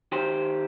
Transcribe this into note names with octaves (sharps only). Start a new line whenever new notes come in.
D#3 G4 C5